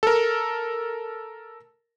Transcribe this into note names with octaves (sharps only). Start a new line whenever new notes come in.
A4 A#4